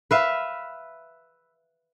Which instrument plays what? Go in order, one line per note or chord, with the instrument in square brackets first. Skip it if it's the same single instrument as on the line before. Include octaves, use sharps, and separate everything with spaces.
[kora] B4 E5 F5